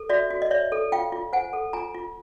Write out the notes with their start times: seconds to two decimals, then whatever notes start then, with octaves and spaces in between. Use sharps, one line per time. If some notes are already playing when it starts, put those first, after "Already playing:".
Already playing: A4
0.09 F#4 D5 E5
0.31 F#4
0.42 D#5
0.51 C#5 D5 E5
0.72 A4
0.92 F4 F5 G5
1.12 F4
1.33 C5 F#5 G#5
1.53 A4
1.73 F4 G#5 A#5
1.94 F4